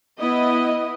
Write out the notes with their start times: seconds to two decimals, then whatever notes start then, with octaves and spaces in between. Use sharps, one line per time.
0.19 B3 E4 D#5